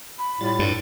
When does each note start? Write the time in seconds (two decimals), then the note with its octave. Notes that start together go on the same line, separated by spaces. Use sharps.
0.18 B5
0.41 A2 G3 F4 A6
0.59 G2 A4